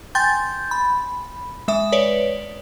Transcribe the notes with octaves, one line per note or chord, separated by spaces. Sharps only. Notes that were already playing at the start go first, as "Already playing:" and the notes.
G5 G#5 C6 G6 A6
B5
G#3 E5 D#6
B4 C#5 D5